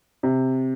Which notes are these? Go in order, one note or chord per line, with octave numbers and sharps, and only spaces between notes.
C3